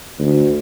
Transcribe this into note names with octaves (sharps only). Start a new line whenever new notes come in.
D2